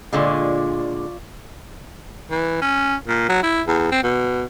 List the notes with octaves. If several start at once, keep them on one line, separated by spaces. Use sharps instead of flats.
A#2 D3 G#3 F4 D5 C#6
E3
C#4
A#2
F#3
E4
E2
C4
B2